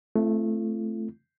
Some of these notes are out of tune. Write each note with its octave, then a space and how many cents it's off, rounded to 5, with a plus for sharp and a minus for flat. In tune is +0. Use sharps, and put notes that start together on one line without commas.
A3 -5 C4 +0 F4 -45